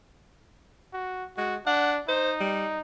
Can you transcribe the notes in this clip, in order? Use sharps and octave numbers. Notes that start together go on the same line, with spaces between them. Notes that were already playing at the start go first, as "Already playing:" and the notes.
F#4
G#3 F#4
D4 F#5
D#4 C5
G3